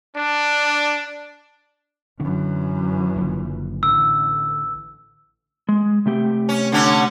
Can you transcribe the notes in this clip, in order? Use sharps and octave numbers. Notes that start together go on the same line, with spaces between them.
D4
F#2 D3 E3 C#4
F#1 D3 F3
A1 D3 E6
G#3
C3 A3 G4
C#4
D3 C#4